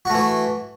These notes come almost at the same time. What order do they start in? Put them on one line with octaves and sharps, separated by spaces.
F#4 A3 E3